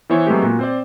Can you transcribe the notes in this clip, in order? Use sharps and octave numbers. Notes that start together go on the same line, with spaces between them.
E3 B3 E4 C5 C#5
F#3 G#3 A3 B3 C4 G4
A#2 F#4
C4 C5 D5